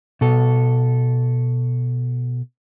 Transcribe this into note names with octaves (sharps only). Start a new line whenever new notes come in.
B2 A4